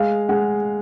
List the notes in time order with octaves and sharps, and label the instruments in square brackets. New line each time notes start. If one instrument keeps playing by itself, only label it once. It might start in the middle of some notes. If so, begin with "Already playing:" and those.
Already playing: [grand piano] G#3 F5
G#3 F#5